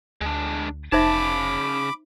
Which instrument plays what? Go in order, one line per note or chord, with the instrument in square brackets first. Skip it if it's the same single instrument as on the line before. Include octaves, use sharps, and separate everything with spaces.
[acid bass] D2 [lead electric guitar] G#3 D4
[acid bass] F1 [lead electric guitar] C#3 A5 [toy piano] D#4 C5 E5 [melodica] B5 D6